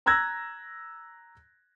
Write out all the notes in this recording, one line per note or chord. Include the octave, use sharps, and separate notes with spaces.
A#5 E6 F#6 G#6 A#6